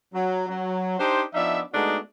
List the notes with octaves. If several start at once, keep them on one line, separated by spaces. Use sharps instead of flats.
F#3
F#3
D4 D#4 G4 C5
F3 B3 D4 D#4 E5
G#3 A3 B3 D4 D#4 F#4